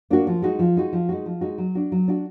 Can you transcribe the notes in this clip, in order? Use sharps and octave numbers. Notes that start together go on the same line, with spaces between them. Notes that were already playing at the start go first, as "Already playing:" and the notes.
A#3 D4 F#4
F3
G#3 D#4 F#4
F3
G#3 D#4 F#4
F3
G#3 D#4 F#4
F3
G#3 D#4 F#4
F#3
D4 F#4
F#3
D4 F#4